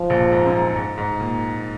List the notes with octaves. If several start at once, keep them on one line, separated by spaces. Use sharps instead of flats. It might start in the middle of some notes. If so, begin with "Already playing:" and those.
Already playing: F3
A#1 A#2
G#2
F#2
G#2
G#2
A#2